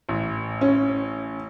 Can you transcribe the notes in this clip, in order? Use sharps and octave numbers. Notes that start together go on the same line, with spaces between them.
A1
C#4